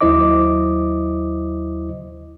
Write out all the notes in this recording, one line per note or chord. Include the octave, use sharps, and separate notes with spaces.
D#2 F#3 E4 C5 D#5 D6